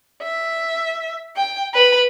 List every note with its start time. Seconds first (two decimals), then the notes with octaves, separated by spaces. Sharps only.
0.23 E5
1.37 G5
1.74 B4 B5